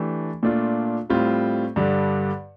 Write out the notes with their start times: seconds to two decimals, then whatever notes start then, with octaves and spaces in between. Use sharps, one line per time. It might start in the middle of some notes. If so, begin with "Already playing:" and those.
Already playing: E3 A3 D4 G4
0.43 A#2 A3 D4 F4
1.10 A2 G3 C4 F4
1.76 G2 D3 G3